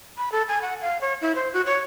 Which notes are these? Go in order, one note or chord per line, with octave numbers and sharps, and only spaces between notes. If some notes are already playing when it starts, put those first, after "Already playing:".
B5
A4
G#5
F#5
F5
C#5
E4
C5
F#4
C#5